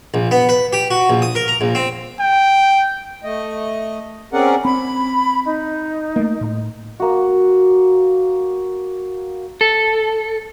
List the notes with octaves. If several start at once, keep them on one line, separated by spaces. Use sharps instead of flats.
A#1
B3
B4
G4
F#4
A#1
D#6
A#4
A#5
A#1
C4
G5
A3 D#5
C4 C#4 G#4 A#4 D5 F#5
C4 B5
D#4
A3 A#3
A2
A#3 F#4
A4